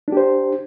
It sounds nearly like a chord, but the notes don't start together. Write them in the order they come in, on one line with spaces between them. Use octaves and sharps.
D4 G4 C5